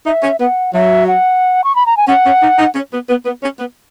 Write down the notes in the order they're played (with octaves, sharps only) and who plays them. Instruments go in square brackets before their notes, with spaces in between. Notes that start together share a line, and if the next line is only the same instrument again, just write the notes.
[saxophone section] D#4 [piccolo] E5
[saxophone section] C#4
[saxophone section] B3 [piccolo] F#5
[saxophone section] F#3 [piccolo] E5
[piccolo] F#5
C#6
B5
A#5
G#5
[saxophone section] C#4 [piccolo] F#5
[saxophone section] C#4
D#4
D#4
C#4
B3
B3
B3
C#4
B3